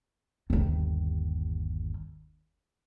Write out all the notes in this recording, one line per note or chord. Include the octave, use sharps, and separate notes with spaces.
G1 D#2